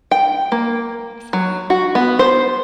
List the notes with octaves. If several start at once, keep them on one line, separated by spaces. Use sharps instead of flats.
G5
A#3
F#3
F#4
B3
C5